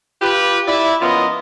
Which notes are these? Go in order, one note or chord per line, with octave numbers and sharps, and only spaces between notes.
F4 G4 B4
E4 D5 E5
F3 B3 C#4 F4 A#4 D#5